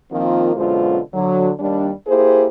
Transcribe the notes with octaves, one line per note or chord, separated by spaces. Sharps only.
D#3 F3 A#3 C4 F4
F#2 B2 D3 G#3 F4 C5
D3 F#3
D#2 G3 D4
A#3 E4 G4 G#4 C5